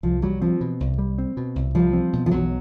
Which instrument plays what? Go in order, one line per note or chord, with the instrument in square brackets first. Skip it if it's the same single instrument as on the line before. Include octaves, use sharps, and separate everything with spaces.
[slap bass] C2 [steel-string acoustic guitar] F3
[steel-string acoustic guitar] F#3 [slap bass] G3
[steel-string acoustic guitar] F3 [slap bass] C4
[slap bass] B2
C2
G3
C4
B2
C2
[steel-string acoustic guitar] F3 [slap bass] G3
[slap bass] C4
B2
[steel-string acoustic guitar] F3
[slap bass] B1 [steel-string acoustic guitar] F#3